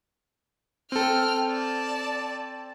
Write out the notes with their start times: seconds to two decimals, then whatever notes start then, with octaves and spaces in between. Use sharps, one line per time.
0.92 C4 A4 G5 F6
1.49 D5 A5